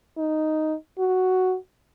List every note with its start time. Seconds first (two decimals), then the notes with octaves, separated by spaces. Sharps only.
0.18 D#4
0.99 F#4